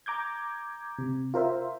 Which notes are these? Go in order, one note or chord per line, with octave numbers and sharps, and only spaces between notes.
A#5 D6 G6 G#6
C3
F4 A#4 C5 E5